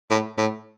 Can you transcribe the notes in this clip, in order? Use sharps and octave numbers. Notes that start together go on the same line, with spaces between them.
A2
A2